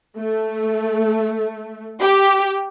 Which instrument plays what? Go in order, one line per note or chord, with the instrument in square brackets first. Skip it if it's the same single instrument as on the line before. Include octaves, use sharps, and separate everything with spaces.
[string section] A3
G4